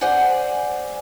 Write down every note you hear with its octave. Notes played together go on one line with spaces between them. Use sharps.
G#4 C5 D5 F#5 G#5